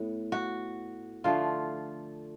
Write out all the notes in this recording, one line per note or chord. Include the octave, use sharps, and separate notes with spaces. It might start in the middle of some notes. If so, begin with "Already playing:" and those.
Already playing: A2 B3
F#4
D3 F3 A3 F4